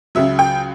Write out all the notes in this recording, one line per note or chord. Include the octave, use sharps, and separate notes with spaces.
C#2 C#3 F#3 E5
G5